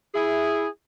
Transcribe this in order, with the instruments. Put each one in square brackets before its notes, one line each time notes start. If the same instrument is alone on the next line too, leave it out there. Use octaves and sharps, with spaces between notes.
[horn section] E4 G#4